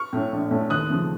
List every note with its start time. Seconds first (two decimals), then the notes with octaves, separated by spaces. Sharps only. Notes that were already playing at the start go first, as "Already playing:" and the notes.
Already playing: C#6 F6
0.13 A2 A3 C#4
0.32 A#1
0.51 A2 A3 C#4
0.70 D#2 D#6 F#6
0.90 C#3 F3 A3